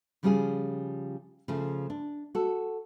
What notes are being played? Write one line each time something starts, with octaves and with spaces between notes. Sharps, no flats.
C#3 F3 G3 C#4 F4 G#4
C#3 F3 A3
D4
F#4 A4